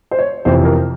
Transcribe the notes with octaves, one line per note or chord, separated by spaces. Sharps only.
C5
C#5
F2 C3 E3 C5
A#4